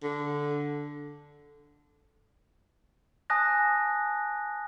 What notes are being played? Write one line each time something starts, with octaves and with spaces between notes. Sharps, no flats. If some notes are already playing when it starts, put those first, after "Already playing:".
D3
G#5 A5 D#6 F#6 A#6